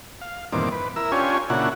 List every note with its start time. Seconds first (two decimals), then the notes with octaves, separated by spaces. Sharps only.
0.22 F5
0.53 E2 G2 A#2 D#3 C4 D6
0.72 B4
0.96 E4 A#4 E6
1.12 C#4 D4 F4 G4 C#5 G#5
1.50 A#2 C#3 D4 E4 F#4 F#5